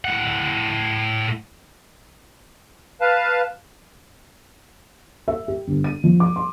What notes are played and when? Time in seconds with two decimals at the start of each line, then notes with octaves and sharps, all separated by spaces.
0.05 A2 F#5
3.01 B4 F5 A5
5.28 E5
5.48 G4
5.68 G1
5.84 D#7
6.04 F3
6.20 D6
6.36 C6